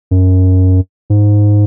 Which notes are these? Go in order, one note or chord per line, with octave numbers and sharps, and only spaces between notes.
F#2
G#2